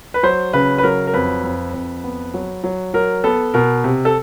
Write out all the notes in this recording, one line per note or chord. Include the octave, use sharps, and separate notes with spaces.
B4
F#3 C5
C#3 B4
B4
F#3 A#4
A#4
F2 B4
F2
F2
B3
F#3
F#3
F#3 A#4
B3 A4
B2 A#4
C3
A4